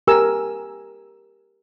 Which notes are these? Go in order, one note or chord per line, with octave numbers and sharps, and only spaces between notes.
G4 A#4 G#5 E6